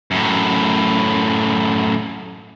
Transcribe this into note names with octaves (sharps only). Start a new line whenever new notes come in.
F#2 A2